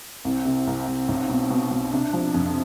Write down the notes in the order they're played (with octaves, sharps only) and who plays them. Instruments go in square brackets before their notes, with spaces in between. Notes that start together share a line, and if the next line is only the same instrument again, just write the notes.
[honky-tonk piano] C2 [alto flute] C4
[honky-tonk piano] C3
C2
C2
B1
B2
B2
B2
[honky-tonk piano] C3 [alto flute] D4
[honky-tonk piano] F3
F2